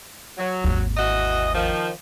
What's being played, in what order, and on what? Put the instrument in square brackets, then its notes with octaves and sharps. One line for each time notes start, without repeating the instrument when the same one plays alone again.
[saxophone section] F#3
[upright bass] G#1 D#2
[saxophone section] E3 F#4 D#5
D#3 F3